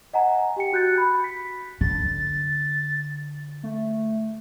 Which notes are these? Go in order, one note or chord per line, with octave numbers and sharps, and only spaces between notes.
D#5 F#5 G#5 A#5
G4 G5 C#7
F#4 F#6 G6 A6 C#7
B5
B6
D3 A6
A3